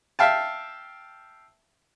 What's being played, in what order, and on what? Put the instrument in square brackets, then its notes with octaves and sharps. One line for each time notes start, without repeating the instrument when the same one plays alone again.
[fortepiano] E5 F5 G5 A5